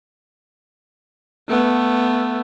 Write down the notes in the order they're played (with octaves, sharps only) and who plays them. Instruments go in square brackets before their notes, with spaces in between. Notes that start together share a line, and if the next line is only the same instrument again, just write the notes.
[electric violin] A3 B3